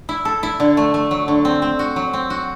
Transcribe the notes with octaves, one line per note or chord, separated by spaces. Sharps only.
E4
A4
E4
D3
A3
A3
F#3
D3
C4
C4
F#4
F#3
C4
F#4